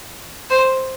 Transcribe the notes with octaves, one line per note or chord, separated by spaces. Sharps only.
C5